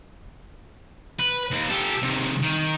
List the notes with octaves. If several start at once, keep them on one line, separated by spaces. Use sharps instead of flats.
B4
D#2
G4 A4
C3 D#3
D#3